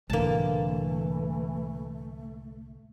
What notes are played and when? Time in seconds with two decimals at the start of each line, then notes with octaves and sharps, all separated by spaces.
0.10 C2 A2 D3 E3 A3 A#3 A5